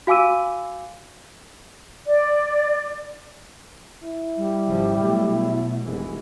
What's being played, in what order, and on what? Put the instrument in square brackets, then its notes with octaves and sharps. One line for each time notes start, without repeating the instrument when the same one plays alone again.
[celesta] F#4 F5 G#5 D6 E6 D#7
[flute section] D5
[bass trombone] E4
[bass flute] G3
[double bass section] G#1 C#3 F3
B2 F#3 A3
[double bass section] F1 E3 G#3 [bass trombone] C2